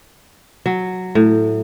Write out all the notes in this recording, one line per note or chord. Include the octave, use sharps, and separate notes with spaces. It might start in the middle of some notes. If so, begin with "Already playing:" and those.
F#3
A2